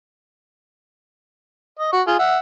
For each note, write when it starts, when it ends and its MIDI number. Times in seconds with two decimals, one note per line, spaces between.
1.79 1.92 75
1.93 2.02 66
1.93 2.02 85
2.07 2.15 65
2.07 2.15 68
2.19 2.38 76
2.19 2.38 78